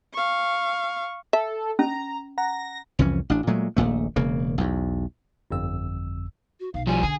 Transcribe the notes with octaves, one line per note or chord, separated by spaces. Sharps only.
F5 C#6
A4 E5
C#4 A#5
F#5 A#5 A#6
C2 F2 E3 C#4
A1 D4
A#2 F#3 G#3 A3
D#1 A#1 A#2 A3
E1 C#3 A#3
B1 E2
G1 F2 E6
F#4
B1 F5
F3 G3 G#5
D3 G#4